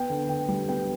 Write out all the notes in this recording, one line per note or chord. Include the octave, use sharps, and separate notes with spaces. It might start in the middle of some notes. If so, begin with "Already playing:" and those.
Already playing: B3 G5
D3
D3 G5
G3
B3 G5